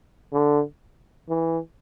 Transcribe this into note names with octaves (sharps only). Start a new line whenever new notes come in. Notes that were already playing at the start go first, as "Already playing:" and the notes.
D3
E3